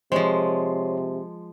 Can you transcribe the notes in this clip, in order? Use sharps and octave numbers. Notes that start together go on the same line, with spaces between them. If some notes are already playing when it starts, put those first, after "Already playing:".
C3 F3 G#3 C5 C#5